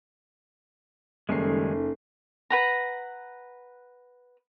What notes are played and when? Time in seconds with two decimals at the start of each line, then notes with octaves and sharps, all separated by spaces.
1.29 F#1 D#3 G3 G#3 C#4 D#4 A4 C7
2.50 B4 F#5 A#5